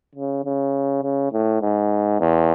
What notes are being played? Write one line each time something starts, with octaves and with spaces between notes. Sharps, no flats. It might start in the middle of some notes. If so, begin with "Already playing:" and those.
C#3
C#3
C#3
A2
G#2
E2